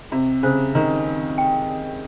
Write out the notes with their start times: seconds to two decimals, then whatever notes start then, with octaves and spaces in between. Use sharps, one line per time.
0.12 C3 D#5
0.43 C#3 C5
0.75 D#3 A#5
1.06 A#4
1.38 G5
1.69 D#5